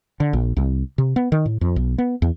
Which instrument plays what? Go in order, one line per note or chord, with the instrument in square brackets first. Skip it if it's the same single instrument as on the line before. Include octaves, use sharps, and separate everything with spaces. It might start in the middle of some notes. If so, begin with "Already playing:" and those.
[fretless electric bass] D3
A#1
C2
C3
B3
D#3
A2
F2
B1
B3
E2